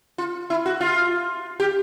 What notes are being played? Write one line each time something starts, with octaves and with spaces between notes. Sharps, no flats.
F4
E4
F#4
F4
G4